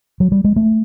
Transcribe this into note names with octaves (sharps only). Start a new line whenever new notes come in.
F#3
G3
G#3
A3